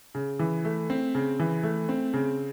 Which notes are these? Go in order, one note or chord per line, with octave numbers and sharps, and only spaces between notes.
C#3
E3
A3
C4
C#3
E3
A3
C4
C#3